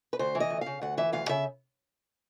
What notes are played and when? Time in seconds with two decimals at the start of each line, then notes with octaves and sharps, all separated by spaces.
0.13 B4
0.19 D2 C5
0.35 E3
0.40 D#5
0.50 D2
0.61 C#3 F5
0.82 D2 F#5
0.97 E3 E5
1.13 D2 F5
1.29 C#3 E5